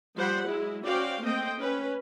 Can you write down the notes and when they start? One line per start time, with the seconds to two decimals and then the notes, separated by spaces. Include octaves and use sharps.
0.16 F3 G3 C5 F#5 B5
0.47 F#3 G#3 E4
0.85 C#4 F#4 C5 D5 F5 G5
1.20 A3 A#3 C4 C5 D#5 G5
1.59 C#4 B4